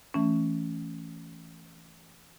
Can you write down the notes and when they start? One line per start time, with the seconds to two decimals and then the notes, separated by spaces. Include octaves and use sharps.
0.14 E3 A3 C#4